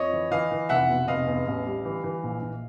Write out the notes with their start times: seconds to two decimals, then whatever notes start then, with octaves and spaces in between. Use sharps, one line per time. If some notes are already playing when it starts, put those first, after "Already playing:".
Already playing: F2 C#5 D#5
0.13 E3
0.31 E3 D#5 F5
0.51 E3
0.69 F1 E5 F#5
0.89 B2
1.08 F1 D#5 F5
1.27 E2
1.46 A1
1.66 G3
1.85 E3
2.04 E3
2.23 A#1
2.42 A#1